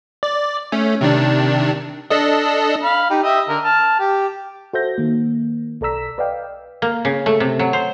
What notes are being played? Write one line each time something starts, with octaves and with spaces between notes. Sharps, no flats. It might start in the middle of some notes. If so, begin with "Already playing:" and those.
D5
A3 C#4
C3 D#3 D4
D4 A4 D#5
F5 B5
D#4 G4
G4 D#5 E5
D3 A#4
A5 F6
G4
F#4 A4 C5 E5 G6 A#6
D#3 A#3
B1 A4 D5 A#5 E6 B6
B4 D5 D#5 F5 G5
A#3
C#3
A3
C3
F#3
C5